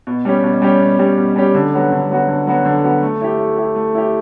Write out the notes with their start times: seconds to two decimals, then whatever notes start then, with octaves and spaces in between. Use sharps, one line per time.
0.07 B2
0.25 G3 C#4 G4
0.44 B2
0.62 G3 C#4 G4
0.80 B2
0.99 G3 C#4 G4
1.17 B2
1.36 G3 C#4 G4
1.55 D3
1.73 F#3 B3 F#4
1.92 D3
2.10 F#3 B3 F#4
2.28 D3
2.47 F#3 B3 F#4
2.65 D3
2.84 F#3 B3 F#4
3.02 A3
3.21 E4 G4
3.39 A3
3.58 E4 G4
3.76 A3
3.95 E4 G4